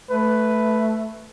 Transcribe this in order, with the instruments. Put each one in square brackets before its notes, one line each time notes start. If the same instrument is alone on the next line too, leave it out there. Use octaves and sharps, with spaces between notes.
[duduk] A3 [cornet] B4